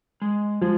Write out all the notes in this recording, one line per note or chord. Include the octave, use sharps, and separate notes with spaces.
G#3
F3 G#3